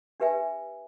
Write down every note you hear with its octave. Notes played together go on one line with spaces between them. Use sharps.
D4 G4 B4 E5 G#5